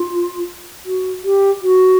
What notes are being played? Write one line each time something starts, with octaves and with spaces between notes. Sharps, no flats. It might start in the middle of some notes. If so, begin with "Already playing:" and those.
Already playing: F4
F#4
G4
F#4